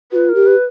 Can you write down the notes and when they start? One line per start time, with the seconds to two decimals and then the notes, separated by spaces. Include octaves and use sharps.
0.12 F4 F#4 B4
0.29 A#4
0.35 G4
0.47 B4